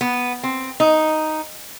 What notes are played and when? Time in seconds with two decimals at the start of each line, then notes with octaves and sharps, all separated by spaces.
0.01 B3
0.43 C4
0.80 D#4